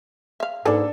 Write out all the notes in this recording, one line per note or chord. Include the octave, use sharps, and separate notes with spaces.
E5 F5
G#2 A#3 D4 G#4 A4 B4